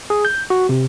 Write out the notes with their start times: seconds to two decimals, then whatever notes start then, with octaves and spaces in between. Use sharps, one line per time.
0.10 G#4
0.25 G6
0.50 F#4
0.69 C3